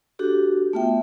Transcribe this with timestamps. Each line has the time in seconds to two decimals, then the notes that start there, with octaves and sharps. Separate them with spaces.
0.19 D4 F#4 G4 A4
0.73 A3 B3 F4 E5 G5